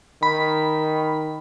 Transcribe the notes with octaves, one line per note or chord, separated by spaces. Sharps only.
D#3 B5